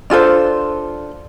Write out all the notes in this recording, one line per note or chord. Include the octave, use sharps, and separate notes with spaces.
D4 F4 A4 C5